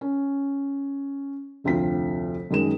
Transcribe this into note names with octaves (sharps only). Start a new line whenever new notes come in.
C#4
F1 D2 C4 F4 B6
F#2 D#3 G#3 E7